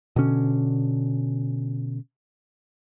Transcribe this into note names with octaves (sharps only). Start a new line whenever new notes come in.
B2 D3 C#4